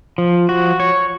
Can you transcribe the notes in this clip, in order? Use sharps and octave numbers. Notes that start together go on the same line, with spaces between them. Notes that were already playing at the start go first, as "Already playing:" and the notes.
F3
F#4
C#5